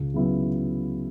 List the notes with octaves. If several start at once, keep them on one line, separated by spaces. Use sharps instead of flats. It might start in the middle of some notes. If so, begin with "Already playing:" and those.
Already playing: C#2
C#3 F#3 B3 E4